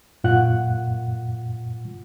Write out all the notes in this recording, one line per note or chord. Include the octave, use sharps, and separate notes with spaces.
F#2 A#2 F4 F#5 F#6